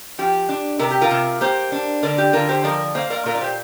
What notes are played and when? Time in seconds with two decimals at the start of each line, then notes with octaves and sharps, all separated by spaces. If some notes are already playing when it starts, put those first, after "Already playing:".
0.18 F3 G4
0.49 D4
0.79 C3 A#4
0.91 G4
1.01 F4 A#4
1.11 C3
1.41 A#3 G4 C5
1.72 D4
2.03 D3 A#4 D5
2.18 G4
2.33 D3 F4 A#4
2.49 G4 C5
2.64 F3 A#4 D5
2.95 A#3 C5 F5
3.10 A#4 D5
3.26 A#2 F4 A#4
3.35 D5
3.41 G4 C5